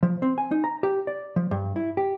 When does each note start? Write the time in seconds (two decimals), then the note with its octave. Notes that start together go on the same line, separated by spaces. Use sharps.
0.03 F3
0.22 C4
0.38 G#5
0.51 D#4
0.64 A#5
0.83 G4
1.07 D5
1.36 F3
1.51 G2
1.76 E4
1.97 G4